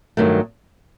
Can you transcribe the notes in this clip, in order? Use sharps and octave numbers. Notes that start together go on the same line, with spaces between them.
G2 D#3 F#3 A3